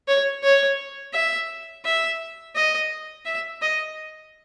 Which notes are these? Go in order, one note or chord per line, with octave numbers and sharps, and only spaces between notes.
C#5
C#5
E5
E5
D#5
E5
D#5